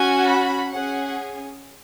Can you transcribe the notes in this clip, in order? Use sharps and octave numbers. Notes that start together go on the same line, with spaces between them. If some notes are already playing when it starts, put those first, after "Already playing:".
Already playing: C#4 F#4 G#5
B5
C#4 G#4 F#5